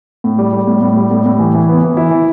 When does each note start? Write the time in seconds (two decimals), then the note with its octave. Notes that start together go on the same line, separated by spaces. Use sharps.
0.24 A2
0.39 G3
0.53 G3
0.67 A2
0.82 A2
0.97 G3
1.11 A2
1.26 A2
1.39 E3
1.54 E3
1.69 B3
1.83 E3
1.97 E4
2.11 E3